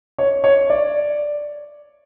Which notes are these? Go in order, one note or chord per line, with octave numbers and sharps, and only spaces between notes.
C#5
C#5
D5